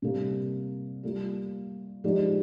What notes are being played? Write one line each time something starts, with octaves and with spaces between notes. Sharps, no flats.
C3 G3 A#3
G3 A#3 F4
F3 G#3 D#4 G4 D5